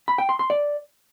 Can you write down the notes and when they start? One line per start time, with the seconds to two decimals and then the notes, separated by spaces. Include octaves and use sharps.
0.08 B5
0.18 G5
0.29 C6
0.39 C6
0.50 D5